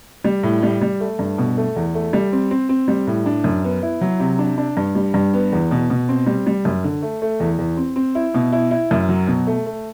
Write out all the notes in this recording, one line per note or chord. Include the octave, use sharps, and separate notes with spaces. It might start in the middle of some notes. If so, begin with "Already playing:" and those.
G3
A2
G3
G3
A3
G2
B2
A3
E2
A3
G3
C4
C4
C4
G3
A2
D4
F#2
B3
E4
F#3
C3
D4
D4
G2
G3
G2
B3
E2
B2
B2
C4
G3
G3
F#2
D3
A3
A3
E2
E2
C4
C4
E4
B2
E4
E4
F#2
F#3
B2
A3
A3